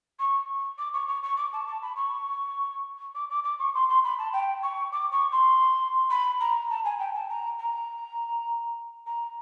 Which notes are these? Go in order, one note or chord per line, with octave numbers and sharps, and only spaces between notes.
C#6
D6
C#6
C#6
C#6
D6
A5
A5
B5
C#6
D6
D6
D6
C#6
C6
C6
B5
A5
G5
C#6
D6
C#6
C6
B5
A#5
A5
G#5
G5
A5
A#5
A#5
A#5